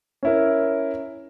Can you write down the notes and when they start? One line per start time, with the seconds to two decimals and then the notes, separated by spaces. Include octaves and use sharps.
0.23 C#4 E4 A#4